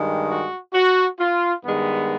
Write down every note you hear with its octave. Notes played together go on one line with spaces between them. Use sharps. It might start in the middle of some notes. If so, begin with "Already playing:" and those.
Already playing: G2 D#3 G#3
F#4
F#4
F4
G2 D#3 G#3 B3